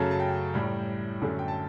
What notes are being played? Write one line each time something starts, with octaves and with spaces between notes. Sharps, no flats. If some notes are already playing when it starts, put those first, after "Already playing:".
Already playing: F#2 C#3 F#3 A3 A5
A5
G5
A2 G3
F#2 D3 A3
G5
A5